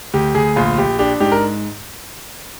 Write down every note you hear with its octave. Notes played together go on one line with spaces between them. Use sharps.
D2 G4
D2 G#4
A#1 F4
A#1 G4
D4 G4
G#2 G4
A#4